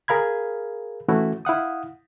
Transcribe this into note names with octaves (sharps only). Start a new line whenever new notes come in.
G#4 A#4 F5 B5 G#6
E3 A3 C#4 E4 F#4
E4 F5 F#5 D#6